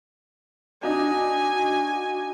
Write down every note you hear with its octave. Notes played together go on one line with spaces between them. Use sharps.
D4 D#4 F#4 G#5